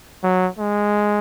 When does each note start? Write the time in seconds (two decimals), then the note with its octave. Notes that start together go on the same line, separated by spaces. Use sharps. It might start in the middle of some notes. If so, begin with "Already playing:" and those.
0.23 F#3
0.59 G#3